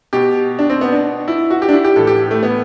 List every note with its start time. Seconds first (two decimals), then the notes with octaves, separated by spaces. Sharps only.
0.13 B2 G4
0.59 D4
0.70 C4
0.81 B3
0.93 D4
1.28 E4
1.50 F#4
1.62 G4
1.69 D4
1.73 E4
1.84 G4
1.96 A2 E3 A4
2.07 G4
2.31 A3
2.43 B3